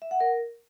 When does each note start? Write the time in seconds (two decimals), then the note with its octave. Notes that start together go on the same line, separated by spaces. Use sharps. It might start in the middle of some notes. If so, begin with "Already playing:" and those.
0.02 E5
0.11 F#5
0.20 A#4